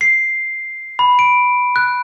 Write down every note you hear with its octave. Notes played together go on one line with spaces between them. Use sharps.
C7
B5
D7
F#6